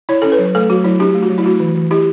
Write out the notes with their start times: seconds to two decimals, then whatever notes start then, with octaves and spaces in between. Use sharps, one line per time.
0.09 E4 C#5
0.22 C#4 A4
0.32 B4
0.39 F#3
0.55 A3 A4
0.69 F#3 F#4
0.84 F#3 E4
1.00 D4 G4
1.15 A3
1.22 F#4
1.30 F#3
1.38 E4
1.44 A3 F#4
1.60 E3
1.75 E3
1.91 E4 G4